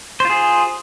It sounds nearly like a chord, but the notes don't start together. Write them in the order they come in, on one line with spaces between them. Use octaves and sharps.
C5 F4 G#4